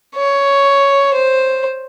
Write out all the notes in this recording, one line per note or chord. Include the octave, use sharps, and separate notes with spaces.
C#5
C5